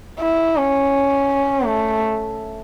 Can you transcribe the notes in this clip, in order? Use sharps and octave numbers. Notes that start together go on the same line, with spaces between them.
E4
C#4
A3